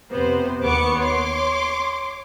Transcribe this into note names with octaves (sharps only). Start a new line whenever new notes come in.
F2 C3 B3 C5
D#2 B3 C#6 D6 C#7
C#5 C6 D6